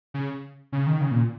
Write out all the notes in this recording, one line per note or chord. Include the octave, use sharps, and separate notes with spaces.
C#3
C#3
D#3
C#3
A#2